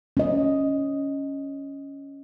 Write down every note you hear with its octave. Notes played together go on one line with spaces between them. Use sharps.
C#4 D#5